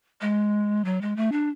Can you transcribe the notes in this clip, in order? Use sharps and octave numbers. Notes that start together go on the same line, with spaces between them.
G#3
F#3
G#3
A3
D4